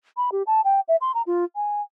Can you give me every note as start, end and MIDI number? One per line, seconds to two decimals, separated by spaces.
0.17 0.30 83
0.32 0.43 67
0.47 0.61 81
0.65 0.80 79
0.88 0.96 76
1.01 1.12 84
1.15 1.22 82
1.27 1.45 65
1.56 1.81 80